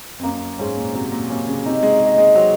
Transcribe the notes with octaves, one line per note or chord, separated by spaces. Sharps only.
F2
F#2 A#3
G#2 C#4 G#4 C5
A#2
C3 F#3
A#2
C3 A#3 C#4
C#3
C3 D#4
G#3
G#4 D#5
G#3
F#3 C4